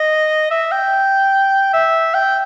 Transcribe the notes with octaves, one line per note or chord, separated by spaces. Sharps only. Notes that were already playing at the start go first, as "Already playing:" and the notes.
Already playing: D#5
E5
G5
E5
G5